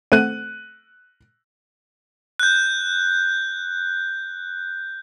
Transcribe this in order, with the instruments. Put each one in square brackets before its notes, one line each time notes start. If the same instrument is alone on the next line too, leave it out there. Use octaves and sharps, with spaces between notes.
[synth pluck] A3 C4 [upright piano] F#6 D#7
[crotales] F#6 G6